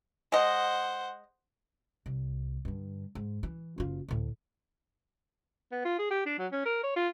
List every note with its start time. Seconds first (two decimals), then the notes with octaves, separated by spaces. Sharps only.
0.32 G#3 C5 D#5 F#5
2.06 C2
2.65 G2 D3
3.15 G#2
3.43 E3
3.78 F#1 F4
4.08 D2 A2
5.71 B3
5.85 F4
5.98 G#4
6.10 G4
6.26 D4
6.38 F#3
6.52 C#4
6.65 A#4
6.83 C#5
6.96 F4